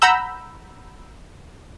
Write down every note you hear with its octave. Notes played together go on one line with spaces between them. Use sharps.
F#5 A#5 B5 E6 G6